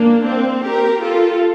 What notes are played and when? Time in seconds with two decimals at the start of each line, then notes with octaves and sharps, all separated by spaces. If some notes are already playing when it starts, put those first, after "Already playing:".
Already playing: A#3 D4
0.24 C4
0.63 G4 A#4
1.02 F4 A4